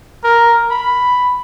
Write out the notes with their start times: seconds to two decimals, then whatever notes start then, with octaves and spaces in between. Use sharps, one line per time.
0.24 A#4
0.71 B5